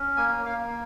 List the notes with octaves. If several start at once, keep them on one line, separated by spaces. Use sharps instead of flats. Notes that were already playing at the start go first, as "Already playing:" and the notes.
Already playing: C#4
A#3 G#5
A#3 F5